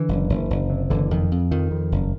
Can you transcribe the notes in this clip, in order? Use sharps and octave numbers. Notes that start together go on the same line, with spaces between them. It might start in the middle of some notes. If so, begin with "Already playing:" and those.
Already playing: D3 E3
F#1
F#1
F#1
C3
F#1 D3 E3
F2 D#3
F2
F2 D#3
F2
F#1